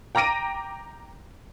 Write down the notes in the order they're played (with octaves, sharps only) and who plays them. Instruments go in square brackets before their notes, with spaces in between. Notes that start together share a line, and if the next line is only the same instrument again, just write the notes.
[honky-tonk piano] G5 A#5 D6 A#6 D7 D#7